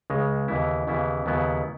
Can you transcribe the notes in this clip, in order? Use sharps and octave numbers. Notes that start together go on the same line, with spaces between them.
C#2 C#3 G#3
D#2 C#3 E3 B3 E4
D#2 C#3 E3 B3 E4
D#2 C#3 F#3 B3 E4